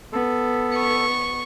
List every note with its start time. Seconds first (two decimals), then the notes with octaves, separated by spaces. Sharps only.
0.13 B3 A4
0.76 C#6